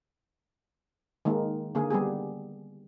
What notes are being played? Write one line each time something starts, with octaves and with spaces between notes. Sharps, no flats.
D#3 G#3 A#3 D#4
D3 A#3 G#4
G3 B3 G4 G#4